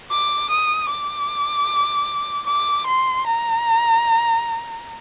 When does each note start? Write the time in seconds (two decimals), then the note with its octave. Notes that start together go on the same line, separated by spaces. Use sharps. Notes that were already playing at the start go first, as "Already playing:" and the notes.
0.11 D6
0.50 D#6
0.89 D6
2.46 D6
2.86 C6
3.26 A#5